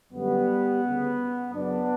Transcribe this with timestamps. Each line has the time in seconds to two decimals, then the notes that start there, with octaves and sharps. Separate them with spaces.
0.12 F#2 D3 F#3 G3 B3
0.82 D2 C#3 G3
1.52 F#2 C#3 F#3 B3 D4